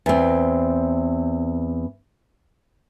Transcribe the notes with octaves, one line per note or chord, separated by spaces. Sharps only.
E2 C4